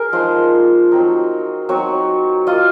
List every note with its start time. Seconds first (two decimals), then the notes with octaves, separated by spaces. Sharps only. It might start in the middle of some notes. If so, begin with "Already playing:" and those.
Already playing: G#4 A#4
0.12 F3 G#3 D#4 C5
0.92 F#3 C4 D#4
1.69 F#3 C4 D#4 C#5
2.47 A#3 F4 D#5